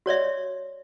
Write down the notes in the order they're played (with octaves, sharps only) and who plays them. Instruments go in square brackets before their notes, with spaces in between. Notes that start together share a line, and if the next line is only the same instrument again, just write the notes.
[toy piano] F#4 C#5 D5 E5